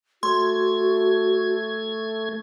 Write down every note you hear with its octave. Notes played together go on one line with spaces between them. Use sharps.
A3 F#4 C6 G#6